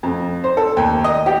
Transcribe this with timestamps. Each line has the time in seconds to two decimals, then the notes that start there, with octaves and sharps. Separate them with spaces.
0.03 F2
0.44 C5
0.57 A4
0.77 D#2
1.04 D#5
1.26 G4